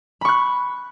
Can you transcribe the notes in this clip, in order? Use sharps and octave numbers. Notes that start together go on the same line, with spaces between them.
B5 C#6 F#6